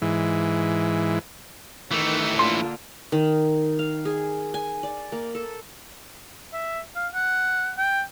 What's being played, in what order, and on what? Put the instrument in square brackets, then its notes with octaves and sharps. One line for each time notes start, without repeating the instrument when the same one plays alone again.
[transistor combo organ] G#2 E3
[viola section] D#3 [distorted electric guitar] E3 A3
[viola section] D3 A#3 F4 [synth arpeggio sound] C6
[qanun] D#3
F5
G#4
G#5
D5
A#3
A4
[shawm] E5
F5
F#5
G5